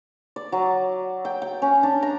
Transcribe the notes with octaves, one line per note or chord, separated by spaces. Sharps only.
D5
F#3
G5
G5
C#4
D4
A#5